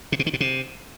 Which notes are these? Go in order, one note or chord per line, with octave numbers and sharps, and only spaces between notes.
C3
B2
D#3
B2
C3